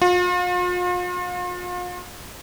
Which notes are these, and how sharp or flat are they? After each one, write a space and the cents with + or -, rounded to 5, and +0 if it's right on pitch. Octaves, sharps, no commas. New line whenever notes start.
F4 +40